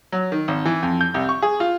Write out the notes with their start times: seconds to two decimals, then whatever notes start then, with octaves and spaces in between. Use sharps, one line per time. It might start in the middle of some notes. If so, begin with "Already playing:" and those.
0.12 F#3
0.32 D#3
0.48 G#1
0.65 E3
0.83 F2
1.01 G6
1.14 C2
1.29 C#6
1.42 G#4
1.60 F4